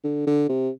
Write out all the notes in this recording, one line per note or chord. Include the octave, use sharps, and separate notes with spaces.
D3
D3
C3